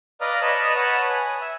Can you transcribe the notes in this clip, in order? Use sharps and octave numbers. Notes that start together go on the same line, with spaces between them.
B4 D5 D#5 F5 A#5
B4 C#5 D#5 A5 B5
B4 C#5 F#5 A5 B5 D#6
G#5
E5